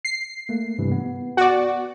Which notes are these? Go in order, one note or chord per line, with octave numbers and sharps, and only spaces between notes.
C7
A3 A#3
G2 C3 E3
B3
F#4 D5